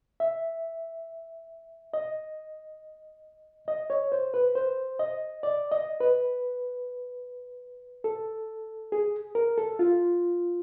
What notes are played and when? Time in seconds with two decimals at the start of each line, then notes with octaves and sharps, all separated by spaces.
0.20 E5
1.94 D#5
3.68 D#5
3.90 C#5
4.12 C5
4.34 B4
4.55 C5
4.99 D#5
5.43 D5
5.72 D#5
6.00 B4
8.04 A4
8.92 G#4
9.35 A#4
9.58 A4
9.79 F4